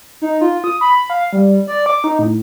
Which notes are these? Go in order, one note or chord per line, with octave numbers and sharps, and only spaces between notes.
D#4
F4
D#6
B5
F5
G3
D5
D6
D#4
A2